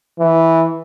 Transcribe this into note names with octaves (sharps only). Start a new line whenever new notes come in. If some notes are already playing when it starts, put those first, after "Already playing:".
E3